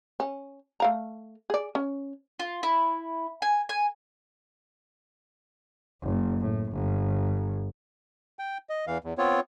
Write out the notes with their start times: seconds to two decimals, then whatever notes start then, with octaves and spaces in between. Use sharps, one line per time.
0.20 C#4
0.80 A3 F5 A#5
1.50 G#4 D5
1.75 C#4
2.40 F4
2.63 E4
3.42 G#5
3.69 G#5
6.02 F#1
6.40 A2
6.72 G1
8.39 G5
8.69 D#5
8.87 E2 E3 F5
9.04 E2
9.18 B3 C4 F4 C#5